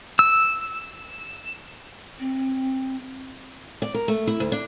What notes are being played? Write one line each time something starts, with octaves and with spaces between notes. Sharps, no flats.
E6
C4
D5
A#4
A3
E4
D2
D4